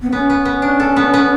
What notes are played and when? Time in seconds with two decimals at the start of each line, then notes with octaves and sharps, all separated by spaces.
0.02 B3
0.12 B3 C#4
0.30 B3
0.45 B3
0.62 D4
0.80 A4
0.96 B3
1.14 B3